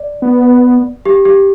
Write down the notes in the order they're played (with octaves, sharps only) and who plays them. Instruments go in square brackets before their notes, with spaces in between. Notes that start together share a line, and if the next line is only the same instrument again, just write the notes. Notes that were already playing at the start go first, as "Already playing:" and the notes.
Already playing: [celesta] D5
[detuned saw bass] B3
[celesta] G4
G4